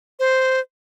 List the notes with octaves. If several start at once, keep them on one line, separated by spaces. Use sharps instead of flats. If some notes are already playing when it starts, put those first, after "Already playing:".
C5